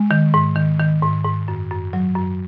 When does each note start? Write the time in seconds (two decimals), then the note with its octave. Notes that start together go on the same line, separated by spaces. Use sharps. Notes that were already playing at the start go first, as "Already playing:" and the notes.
Already playing: G#3
0.11 D#3
0.34 G#2
0.56 D#3
0.80 D#3
1.03 G#2
1.24 G#2
1.48 F#2
1.71 F#2
1.93 F#3
2.15 F#2